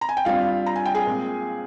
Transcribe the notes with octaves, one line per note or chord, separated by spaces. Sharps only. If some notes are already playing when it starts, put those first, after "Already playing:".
A#5
G#5
G5
G2 G3 C4 F4 F5
A#5
G#5
G5
G#4 G#5
A#2 G#3 C4